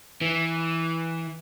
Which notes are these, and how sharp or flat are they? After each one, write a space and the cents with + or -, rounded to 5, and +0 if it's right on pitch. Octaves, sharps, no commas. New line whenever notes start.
E3 -5